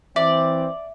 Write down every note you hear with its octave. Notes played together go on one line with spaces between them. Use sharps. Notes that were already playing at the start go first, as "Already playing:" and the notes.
E3 C4 D5 E5